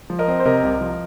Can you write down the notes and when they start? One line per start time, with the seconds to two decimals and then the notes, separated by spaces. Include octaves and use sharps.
0.10 F3
0.19 A#4 D#5
0.28 C4
0.40 C5
0.45 C3 A#4 D#5
0.63 C2
0.81 F3